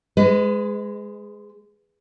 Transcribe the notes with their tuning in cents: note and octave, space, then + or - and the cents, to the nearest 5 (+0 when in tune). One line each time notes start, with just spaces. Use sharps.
G#3 +0 B4 +35